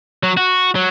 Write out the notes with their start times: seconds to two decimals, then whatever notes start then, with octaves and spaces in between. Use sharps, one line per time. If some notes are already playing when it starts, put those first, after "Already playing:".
0.23 F#3
0.37 F#4
0.75 F#3